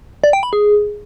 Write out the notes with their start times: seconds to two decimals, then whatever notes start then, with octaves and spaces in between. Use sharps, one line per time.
0.24 D5
0.33 G5
0.43 B5
0.53 G#4